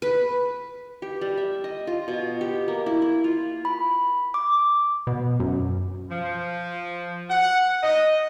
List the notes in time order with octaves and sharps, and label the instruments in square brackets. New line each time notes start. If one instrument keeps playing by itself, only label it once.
[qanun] B4
G4
G3
E5
D#5
F4
B2
G4
A#3
E4
E4
F4
[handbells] B5
D6
[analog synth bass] B2
F#2
[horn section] F3
F#5
D#5